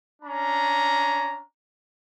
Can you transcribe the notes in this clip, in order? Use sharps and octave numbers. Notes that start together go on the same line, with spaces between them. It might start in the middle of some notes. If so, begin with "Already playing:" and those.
C#4 D4 A#5